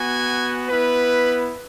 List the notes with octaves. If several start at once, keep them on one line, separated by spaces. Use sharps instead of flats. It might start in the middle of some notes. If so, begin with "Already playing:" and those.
Already playing: B3 F#4 G#5
B3 E4 B4